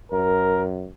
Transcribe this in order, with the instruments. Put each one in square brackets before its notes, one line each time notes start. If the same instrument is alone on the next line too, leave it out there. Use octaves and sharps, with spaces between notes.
[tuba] F#2 [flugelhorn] A#4